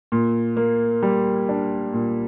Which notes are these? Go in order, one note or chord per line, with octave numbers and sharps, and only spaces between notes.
A#2
A#3
G3
D4
A#2